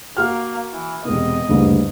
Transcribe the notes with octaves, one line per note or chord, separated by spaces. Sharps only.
A#3 F#4 F6
E3
E1 C3 B3 D#5
F#1 D2 G2